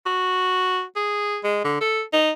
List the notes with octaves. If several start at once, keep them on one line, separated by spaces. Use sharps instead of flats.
F#4
G#4
G#3
D3
A4
D#4